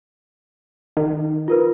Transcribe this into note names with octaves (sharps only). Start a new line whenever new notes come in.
D#3
F4 A#4 B4